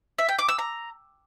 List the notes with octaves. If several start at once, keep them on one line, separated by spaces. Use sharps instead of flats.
E5
G5
D6
E6
A#5